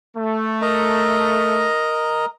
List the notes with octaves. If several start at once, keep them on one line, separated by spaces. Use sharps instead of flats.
A3
A#4 D#5 A#5